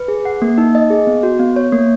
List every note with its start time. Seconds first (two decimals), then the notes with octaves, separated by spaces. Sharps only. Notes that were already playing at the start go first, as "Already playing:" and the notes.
Already playing: B4
0.08 G#4
0.25 F#5
0.42 A#3
0.58 D#4
0.75 D#5
0.90 G#4
1.07 B3
1.23 F#4
1.40 B3
1.56 C#5
1.73 A#3